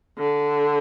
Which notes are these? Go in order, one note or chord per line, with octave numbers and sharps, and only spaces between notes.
D3